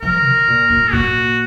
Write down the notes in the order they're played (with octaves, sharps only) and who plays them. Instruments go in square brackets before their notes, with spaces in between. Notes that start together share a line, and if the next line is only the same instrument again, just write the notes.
[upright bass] F3 [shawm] A#4
[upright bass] B2
A#2
A#2
[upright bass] A#2 [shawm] F#4